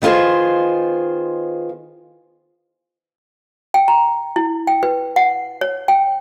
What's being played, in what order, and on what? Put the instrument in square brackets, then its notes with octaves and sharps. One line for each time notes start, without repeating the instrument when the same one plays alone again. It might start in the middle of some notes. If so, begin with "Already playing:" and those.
[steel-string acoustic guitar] D#3 B3 F4 G#4 C5
[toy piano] G5
A#5
E4
G5
B4
F#5
C#5
G5